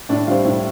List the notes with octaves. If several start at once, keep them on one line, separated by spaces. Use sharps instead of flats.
A2 D4
G3 C4 F4
A2